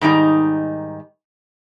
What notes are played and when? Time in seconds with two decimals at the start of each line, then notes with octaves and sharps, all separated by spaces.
0.01 G#2 D#3 G3 D#4